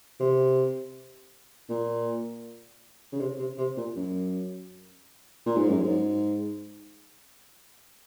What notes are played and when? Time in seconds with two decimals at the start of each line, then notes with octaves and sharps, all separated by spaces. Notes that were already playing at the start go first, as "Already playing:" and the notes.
0.20 C3
1.69 A#2
3.12 C#3
3.20 C3
3.39 C3
3.58 C3
3.77 A#2
3.96 F#2
5.46 A#2
5.57 G#2
5.68 F#2
5.81 G#2